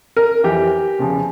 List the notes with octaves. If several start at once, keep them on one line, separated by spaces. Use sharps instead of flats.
A#4
F2 E3 G4
E2 C#3 F3